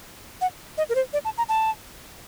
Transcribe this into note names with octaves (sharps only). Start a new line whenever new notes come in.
F#5
D#5
A#4
C5
D5
A5
A#5
A5